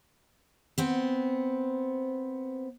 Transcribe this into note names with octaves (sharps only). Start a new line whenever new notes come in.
B3 C4 C5